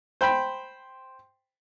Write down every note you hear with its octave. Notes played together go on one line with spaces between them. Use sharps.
C5 G5 B5